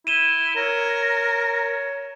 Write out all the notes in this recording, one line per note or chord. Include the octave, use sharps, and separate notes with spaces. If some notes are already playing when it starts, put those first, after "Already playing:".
E4 D#7 E7 G7
A#4 C#5